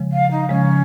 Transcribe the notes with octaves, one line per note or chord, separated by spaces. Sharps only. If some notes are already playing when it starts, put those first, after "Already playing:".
Already playing: C#3 F3 G#3
F5
D#4
C#3 F3 G#3 C#4